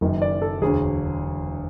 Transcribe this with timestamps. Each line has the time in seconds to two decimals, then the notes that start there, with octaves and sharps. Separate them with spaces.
0.01 F#1 F#2 D#3
0.22 D5
0.42 A4
0.62 E1 D2 D3 G#4